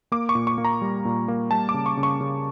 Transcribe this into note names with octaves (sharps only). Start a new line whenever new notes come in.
A#3 D6
C#6
A#2
C#6
A#3
A#5
G3
A#2
A#3
G3 A5
D6
C#3
C#6
C#3
C#6
C#3